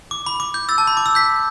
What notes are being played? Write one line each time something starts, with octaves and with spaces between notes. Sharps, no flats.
D6
B5
D6
G6
E6 A6
A5
B5
D6
E6
G6 B6